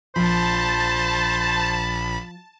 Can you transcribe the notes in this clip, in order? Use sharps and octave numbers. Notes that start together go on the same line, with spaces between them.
A#1 F3 C5 A5 B5